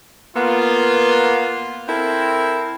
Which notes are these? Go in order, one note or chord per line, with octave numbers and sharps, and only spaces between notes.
A#3 B3 F4
C4 E4 A4 A#4